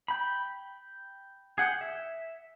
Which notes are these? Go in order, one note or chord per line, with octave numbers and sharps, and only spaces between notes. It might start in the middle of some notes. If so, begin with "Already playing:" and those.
G5 B5
G#4 F#5 G5
E5